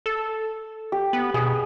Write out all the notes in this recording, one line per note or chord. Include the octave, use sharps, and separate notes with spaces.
A4
G4
B3
B2 G#4